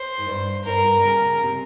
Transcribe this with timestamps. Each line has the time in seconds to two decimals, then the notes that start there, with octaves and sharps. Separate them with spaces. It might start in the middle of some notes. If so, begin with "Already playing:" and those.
Already playing: C5
0.18 G#2
0.27 G2
0.65 G2 A#4
0.85 G2
1.04 C#3
1.23 C#3
1.43 C3